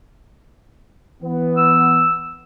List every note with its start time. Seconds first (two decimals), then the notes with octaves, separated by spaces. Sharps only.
1.23 E3 B3
1.57 E6